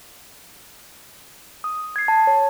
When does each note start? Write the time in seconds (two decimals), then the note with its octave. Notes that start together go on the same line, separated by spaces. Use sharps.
1.64 D#6
1.96 G#6 C7
2.08 A5
2.27 C#5